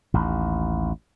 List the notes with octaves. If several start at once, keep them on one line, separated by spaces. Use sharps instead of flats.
A1 D#2